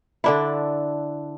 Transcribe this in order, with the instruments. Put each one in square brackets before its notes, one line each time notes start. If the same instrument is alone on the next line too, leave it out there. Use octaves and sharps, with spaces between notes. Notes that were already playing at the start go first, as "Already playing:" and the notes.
[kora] D3 D4 E4